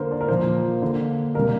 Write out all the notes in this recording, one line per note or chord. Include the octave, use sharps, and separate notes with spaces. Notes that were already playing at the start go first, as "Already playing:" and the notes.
Already playing: D3 A#3 A#4 C5
D5
A#4
A#2 F3 A#3 C5
D3 A#3
C3 G3 A#3 A#4